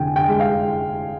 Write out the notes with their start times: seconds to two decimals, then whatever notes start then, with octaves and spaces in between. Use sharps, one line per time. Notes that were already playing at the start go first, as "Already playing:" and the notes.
Already playing: F1 F2 D3 G5 G#5
0.16 G5
0.29 G#3
0.40 F5